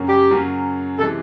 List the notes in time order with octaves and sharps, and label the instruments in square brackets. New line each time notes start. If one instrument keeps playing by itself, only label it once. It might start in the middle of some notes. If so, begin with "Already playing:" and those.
Already playing: [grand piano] F#2 C#3 F#3 A#3 C#4
[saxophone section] G4
[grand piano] F#2 C#3 F#3 A#3 C#4
[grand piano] C3 E3 G#3 [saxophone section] A4